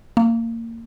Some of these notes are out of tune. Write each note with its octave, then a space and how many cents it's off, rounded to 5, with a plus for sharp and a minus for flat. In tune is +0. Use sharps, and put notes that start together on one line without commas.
A#3 -25